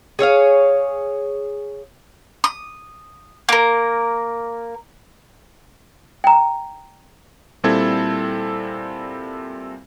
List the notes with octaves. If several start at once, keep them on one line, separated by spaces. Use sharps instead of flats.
G#4 C#5 E5 F5
D#6
A#3 A#4
G5 A#5
A#2 G3 C4 E4 A4 G#6